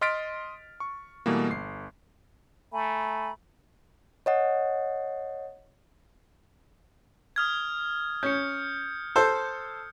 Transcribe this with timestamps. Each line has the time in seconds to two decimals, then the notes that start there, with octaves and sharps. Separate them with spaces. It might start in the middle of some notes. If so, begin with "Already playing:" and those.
0.01 D#5 C6 F6 A6 B6 D7
0.80 C#6
1.26 B2 E3 G3 A3 A#3
1.50 G1 C7
2.73 A3 G#5 A#5 B5
4.26 C#5 D#5 F#5
7.36 D#6 F6 G#6
8.23 C#4 G6 C#7
9.16 A4 C5